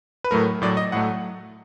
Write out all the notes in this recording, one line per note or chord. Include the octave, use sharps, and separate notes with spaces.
B4
A2 F#3 A3 A#4
A2 F#3 A3 D5
D#5
A2 F#3 A3 F#5